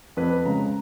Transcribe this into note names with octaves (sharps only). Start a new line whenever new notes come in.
F2 B4
C#3 G#3 A#5